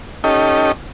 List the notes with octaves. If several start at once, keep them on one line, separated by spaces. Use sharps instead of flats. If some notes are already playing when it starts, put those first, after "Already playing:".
C#4 D#4 G4 A4 D#5